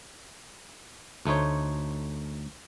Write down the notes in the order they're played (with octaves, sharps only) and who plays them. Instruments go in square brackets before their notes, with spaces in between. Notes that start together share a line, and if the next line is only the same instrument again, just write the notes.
[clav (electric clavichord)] D2 A3 D#4 C5 C#5